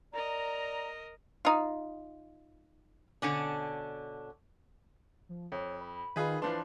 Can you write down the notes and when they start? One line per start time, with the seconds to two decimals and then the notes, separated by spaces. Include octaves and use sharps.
0.14 A#4 D5 D#5 A#5
1.45 D#4 F4
3.22 B2 D3 C#4 D4
5.29 F3
5.52 F2 C#5
5.81 B5
6.16 D#3 F4 G#4 B4
6.42 E3 F3 D4 B4 C6